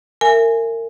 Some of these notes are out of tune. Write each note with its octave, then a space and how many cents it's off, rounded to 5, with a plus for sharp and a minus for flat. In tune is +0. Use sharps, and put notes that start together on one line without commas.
A#4 -30 E5 +20 G#5 +0